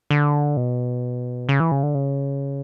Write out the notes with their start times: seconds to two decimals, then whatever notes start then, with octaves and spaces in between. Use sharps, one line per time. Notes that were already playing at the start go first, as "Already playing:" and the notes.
0.11 D3
0.57 B2
1.49 C#3
1.60 E3
1.72 C#3
1.83 D3
1.95 C#3